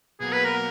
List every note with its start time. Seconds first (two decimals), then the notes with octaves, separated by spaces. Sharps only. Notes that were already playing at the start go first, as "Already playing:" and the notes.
0.20 B2 F#3 A#3 G#4
0.32 B4
0.44 A#4